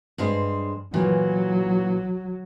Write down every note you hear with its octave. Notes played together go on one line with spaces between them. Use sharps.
G2 G#3 C5
A#2 E3 F#3